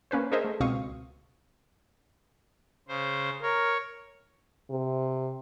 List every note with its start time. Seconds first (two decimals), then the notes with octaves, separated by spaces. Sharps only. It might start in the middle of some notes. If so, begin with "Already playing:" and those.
0.11 A#3 C#4 B4 C5
0.31 D4 G#4 A#4 C5 D#5 E5
0.45 A3
0.60 C#2 B2 C4 F5 C#6 D#6
2.88 C#3 C5
3.42 A#4 C#5
4.70 C3